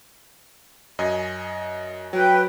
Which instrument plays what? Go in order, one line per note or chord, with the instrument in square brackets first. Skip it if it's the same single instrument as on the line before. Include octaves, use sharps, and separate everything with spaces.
[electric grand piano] F#2 D#5 G#5
[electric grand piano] F#3 [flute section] B4 G5